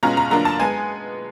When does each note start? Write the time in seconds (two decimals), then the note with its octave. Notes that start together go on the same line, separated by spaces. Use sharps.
0.03 B2 G#3 C#4 F4 A#5
0.17 A#5
0.31 D3 F#3 A#3 D4 F4 A#5
0.45 A5
0.59 G#3 B3 G#5